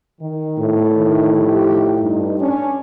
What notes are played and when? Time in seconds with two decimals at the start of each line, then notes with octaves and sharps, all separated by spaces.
0.21 D#3
0.59 A2
0.97 D#3
1.37 F3 D#4 G4
2.01 G2 D#4
2.40 C#4 D4